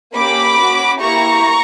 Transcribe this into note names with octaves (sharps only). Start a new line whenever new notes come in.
A#3 C#4 G4 B5 D6
C#4 F#4
A#3 E4 G4 A#5 C#6